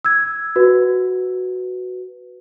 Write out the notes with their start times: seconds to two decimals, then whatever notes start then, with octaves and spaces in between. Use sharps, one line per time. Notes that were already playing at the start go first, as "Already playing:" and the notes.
0.05 E6 G#6
0.56 F#4 B4